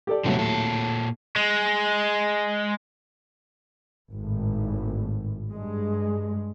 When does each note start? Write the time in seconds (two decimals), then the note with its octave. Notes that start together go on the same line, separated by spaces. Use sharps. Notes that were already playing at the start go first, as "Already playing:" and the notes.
0.07 G4 A4 D5
0.24 D#2 A2 C3 F#3 B3
0.39 A#2 A4
1.36 G#3
4.12 G#1 A2
5.52 G2 G#3